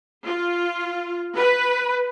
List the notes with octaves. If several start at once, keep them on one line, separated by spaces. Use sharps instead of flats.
F4
B4